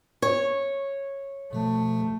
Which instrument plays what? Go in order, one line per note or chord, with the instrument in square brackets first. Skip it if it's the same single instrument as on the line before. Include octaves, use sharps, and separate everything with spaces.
[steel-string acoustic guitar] C#5
[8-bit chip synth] B2 F3 [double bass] A3